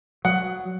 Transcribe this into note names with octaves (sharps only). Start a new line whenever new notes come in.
F#3 F#5